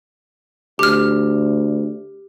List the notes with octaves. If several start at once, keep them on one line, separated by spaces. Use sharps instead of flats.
D2 G4 F6